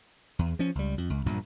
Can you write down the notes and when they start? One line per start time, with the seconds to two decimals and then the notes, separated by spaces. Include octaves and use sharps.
0.39 E2
0.59 F3 C#4
0.75 C#2 G3
0.98 F2
1.10 C#2
1.26 A#1 G2 A#2